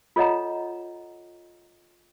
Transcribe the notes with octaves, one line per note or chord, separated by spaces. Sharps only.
F4 A4 C#5 D#5 F#5 A#5